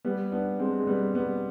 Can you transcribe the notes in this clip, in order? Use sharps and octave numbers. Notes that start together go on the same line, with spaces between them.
G3 B3
B3 D4
G#3 C4
G#3
G3 B3
G3 B3